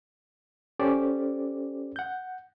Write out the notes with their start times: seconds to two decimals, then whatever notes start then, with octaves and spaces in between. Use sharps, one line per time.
0.79 C#4 G4 A4 C5 D5
1.96 F#5 G6